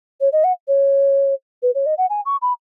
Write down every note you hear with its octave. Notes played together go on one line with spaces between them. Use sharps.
C#5
D#5
F#5
C#5
B4
C#5
D#5
F#5
G#5
C#6
B5